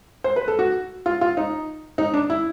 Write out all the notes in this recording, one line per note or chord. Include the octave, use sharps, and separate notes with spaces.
C5
B4
A4
F#4
F4
F4
D#4
D#4
D4
E4